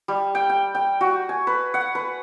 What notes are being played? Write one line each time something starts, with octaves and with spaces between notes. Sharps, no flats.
G3
G5
G5
G5
F#4
G#5
B4
F#5
B4